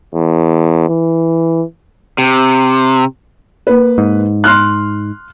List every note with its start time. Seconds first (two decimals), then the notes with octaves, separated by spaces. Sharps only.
0.15 E2
0.89 E3
2.18 C3
3.67 A#3 B4
3.98 G#2
4.44 C6 F6 F#6